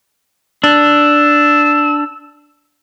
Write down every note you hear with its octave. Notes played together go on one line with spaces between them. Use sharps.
D4 E6